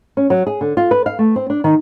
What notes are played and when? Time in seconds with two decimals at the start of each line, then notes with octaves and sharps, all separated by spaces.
0.17 C#4
0.30 F#3
0.47 G#4
0.61 D3
0.77 F4
0.91 B4
1.06 F5
1.19 A3
1.36 C4
1.50 D4
1.64 D#3